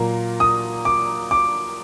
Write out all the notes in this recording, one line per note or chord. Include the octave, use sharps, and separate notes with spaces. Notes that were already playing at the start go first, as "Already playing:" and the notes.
Already playing: A#2 F#3 A#3
D#6
D6
D6